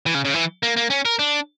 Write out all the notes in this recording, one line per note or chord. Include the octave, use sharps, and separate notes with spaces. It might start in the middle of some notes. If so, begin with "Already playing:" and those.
E3
C#3
C#3
E3
A#3
A#3
C#4
A#4
D4